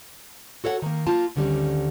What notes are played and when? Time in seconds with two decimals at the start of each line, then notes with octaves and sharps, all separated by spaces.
0.64 F#4 A4 C#5 F5 F#5
0.82 D#3 A#3
1.07 A#3 F4 A5
1.36 D2 D3 D#3 G3 C#4